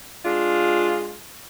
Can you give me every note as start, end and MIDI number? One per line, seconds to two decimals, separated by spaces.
0.24 1.14 56
0.24 1.14 62
0.24 1.14 65